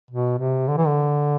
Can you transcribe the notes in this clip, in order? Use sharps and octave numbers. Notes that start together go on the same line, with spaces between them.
B2
C3
D3
E3
D3